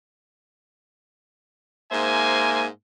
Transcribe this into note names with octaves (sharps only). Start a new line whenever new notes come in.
G#2 A#3 C5 E5 G#5